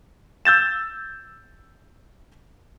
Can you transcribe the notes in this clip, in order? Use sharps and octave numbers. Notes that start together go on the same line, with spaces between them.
E6 G6 A6 E7